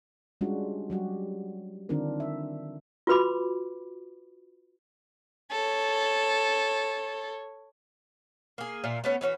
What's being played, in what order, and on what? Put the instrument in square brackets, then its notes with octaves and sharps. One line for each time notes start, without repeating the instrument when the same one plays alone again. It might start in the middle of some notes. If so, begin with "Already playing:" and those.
[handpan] G3 G#3 C#4 D4 F4 F#4
F#3 G3 F#4 G4
D3 D#3 C4 D4 F4 A#4
E5
[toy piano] F4 F#4 B4 B5 D6
[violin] A4 C#5
[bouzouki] A#3 G#4
A#2 F4 D5 E5
A3 B3 C#4
E3 A3 C#4 F#4